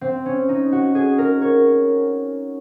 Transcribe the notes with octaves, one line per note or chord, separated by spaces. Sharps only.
C4
C#4
D#4
F#4
G#4
A#4
C#5